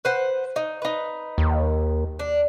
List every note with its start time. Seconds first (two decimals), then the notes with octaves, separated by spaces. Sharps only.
0.05 B4 C5 F#5
0.56 D#4
0.82 D#4 B4
1.38 D#2
2.19 D4